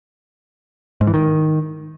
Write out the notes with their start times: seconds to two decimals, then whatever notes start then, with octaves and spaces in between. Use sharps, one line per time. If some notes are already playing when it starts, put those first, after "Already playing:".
1.01 G#2
1.07 E3
1.14 D#3